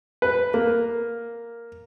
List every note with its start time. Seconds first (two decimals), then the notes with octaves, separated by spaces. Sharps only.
0.22 B4
0.54 A#3